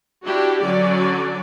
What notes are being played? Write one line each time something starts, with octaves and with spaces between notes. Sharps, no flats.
D4 E4 F#4 G4
D3 F#3 C#4 F#4 D5